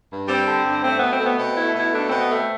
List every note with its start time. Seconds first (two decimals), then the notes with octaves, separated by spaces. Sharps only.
0.10 G2
0.28 G3 C4
0.47 D3
0.65 G2
0.83 A3 C4
0.97 B2 B3
1.11 C4
1.20 A3 B3
1.38 B2 C4
1.56 A3 E4
1.75 B2 E4
1.94 A3 D4
2.07 B2 C4
2.21 B3
2.30 A3
2.35 C4